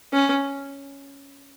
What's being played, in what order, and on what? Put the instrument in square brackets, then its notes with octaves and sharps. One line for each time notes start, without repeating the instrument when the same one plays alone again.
[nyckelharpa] C#4